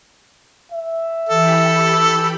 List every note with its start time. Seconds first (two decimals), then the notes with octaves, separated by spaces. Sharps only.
0.72 E5
1.29 E3 G4 A4 B5